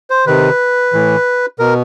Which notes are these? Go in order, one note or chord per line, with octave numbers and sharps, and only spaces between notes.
C5
C3 D#3 B4
A2 E3
B2 A#4